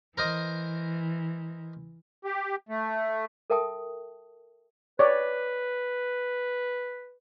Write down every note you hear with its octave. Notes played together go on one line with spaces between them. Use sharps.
E3 A#4 C5 D#5
G4
A3
A4 A#4 E5 G5 A5 D#6
B4 C#5 D5